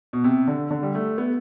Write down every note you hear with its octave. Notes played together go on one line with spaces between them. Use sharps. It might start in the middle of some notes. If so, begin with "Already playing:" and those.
B2
C3
D3
D3
G3
A3
B3